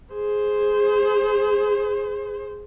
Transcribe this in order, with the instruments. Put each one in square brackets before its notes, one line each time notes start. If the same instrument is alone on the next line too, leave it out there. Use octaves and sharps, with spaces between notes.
[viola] G#4 C5